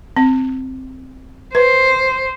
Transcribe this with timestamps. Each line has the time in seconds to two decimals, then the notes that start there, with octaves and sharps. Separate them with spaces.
0.17 C4
1.55 B4 C5